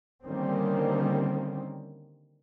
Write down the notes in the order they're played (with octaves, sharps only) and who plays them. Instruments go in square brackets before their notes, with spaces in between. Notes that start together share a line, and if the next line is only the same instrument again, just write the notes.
[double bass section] D3 D#3 G3 A#3 C4 C#4